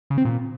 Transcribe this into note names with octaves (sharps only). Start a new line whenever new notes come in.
C#3
C4
A#2